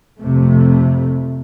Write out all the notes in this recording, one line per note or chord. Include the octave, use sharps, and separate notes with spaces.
F2 C3 A3